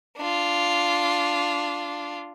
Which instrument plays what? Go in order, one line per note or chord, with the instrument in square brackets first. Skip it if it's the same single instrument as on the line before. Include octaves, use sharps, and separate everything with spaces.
[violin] D4 F4